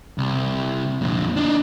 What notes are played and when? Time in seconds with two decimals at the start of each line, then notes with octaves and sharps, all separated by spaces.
0.18 C2
1.01 F2 A#2
1.37 D4 D#4